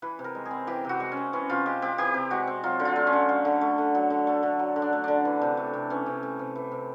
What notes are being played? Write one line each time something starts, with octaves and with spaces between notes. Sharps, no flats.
E3 B4
C3
A#4
G#3
G#4
C4
E3 G4
C3 F#4
G#3
C#4
C4
E3 C#4
C3 F4
G#3 G4
C4 G4
E3 G4
C3
G#3 F#4
C4
F#3 F4
D3
F4
A3
C#4
D3
F#3
D3
A3
D3
F#3
D3
A3
D3
F#3
D3
D4
A3
D3 D4
E3
C3
A3
C3
E3 C#4
C3
A3
C3
E3
C3